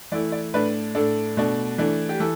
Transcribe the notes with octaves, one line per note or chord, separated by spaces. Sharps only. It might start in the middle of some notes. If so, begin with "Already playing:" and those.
E3 A3 E4 D5
D5
A2 A3 D4 B4
A2 A3 D4 A4
B2 A3 D4
E3 A3 D4
G4
E3 A4